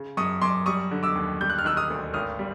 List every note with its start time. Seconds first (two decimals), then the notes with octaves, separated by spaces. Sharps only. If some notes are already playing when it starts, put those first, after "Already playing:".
Already playing: C#3
0.17 F#2 C#6 D#6
0.42 F#2 C6 D6
0.66 G3 C#6 D#6
0.91 D3
1.03 D6 E6
1.15 D#2
1.41 G3 G6
1.50 F#6
1.58 F6
1.64 D#3 E6 F#6
1.77 D#6 F6
1.90 D2
2.14 G#1 D#6 F6
2.39 G3